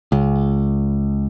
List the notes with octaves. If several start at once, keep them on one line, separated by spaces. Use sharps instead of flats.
C#2